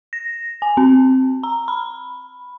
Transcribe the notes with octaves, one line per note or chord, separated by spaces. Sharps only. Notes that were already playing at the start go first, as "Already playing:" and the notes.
A#6
G#5
C4
A#5
B5